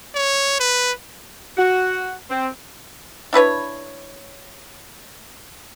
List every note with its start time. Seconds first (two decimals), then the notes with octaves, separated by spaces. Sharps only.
0.15 C#5
0.60 B4
1.57 F#4
2.30 C4
3.33 D4 E4 B4 C#5